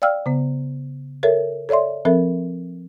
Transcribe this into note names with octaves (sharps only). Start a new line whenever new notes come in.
D5 F5 G5 E6 F6
C#3 B3
A4 A#4 C#5 E5
A4 C#5 D5 E5 C6
F3 C4 A4 A#4 E5